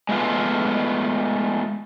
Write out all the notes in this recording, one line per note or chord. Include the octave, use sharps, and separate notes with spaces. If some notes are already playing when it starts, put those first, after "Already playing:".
G#3 A3 B3 F4